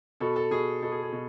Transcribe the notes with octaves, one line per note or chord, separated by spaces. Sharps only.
B2 A4
A4
B2 G#4
B2 A4
G#4
G#4
B2